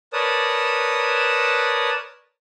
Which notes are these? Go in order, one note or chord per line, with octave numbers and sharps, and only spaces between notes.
A#4 B4 C#5 D5 A5 D#6